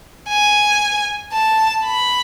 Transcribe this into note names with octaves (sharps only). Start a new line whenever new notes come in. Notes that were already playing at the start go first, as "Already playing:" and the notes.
G#5
A5
B5